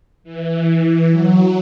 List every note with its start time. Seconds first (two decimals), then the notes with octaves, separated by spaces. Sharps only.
0.24 E3
0.67 E3
1.10 F#3